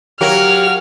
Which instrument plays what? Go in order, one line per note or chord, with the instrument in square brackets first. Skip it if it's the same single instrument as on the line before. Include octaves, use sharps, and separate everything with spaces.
[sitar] F#3 A#4 [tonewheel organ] G4 F5 F#5 [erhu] F6